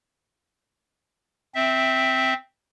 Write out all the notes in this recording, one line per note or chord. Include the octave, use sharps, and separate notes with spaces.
C4 E5